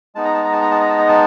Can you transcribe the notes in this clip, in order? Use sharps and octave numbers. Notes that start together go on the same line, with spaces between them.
G#3 B3 D#4 A5
A#5
A5
A#5
A5
A#5
A5
A#5
A5
A#5
A5